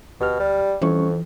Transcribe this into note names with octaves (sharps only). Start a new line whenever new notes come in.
D2 B2 G4 F6
G3
F2 E3 G3 C#4 C#6